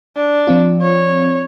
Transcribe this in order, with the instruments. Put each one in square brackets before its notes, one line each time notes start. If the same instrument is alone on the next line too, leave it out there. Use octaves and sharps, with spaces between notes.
[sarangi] D4
[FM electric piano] F3 C4 F4
[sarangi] C#5